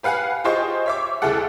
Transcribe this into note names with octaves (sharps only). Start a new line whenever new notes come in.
G4 B4 F5 F#5 G#5
F4 G4 G#4 C5 D#5 C#6
C#5 E5 D6
D2 C#3 E4 G#4 A4 F#5